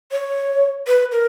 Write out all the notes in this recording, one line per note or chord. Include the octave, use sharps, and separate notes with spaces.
C#5
B4
A#4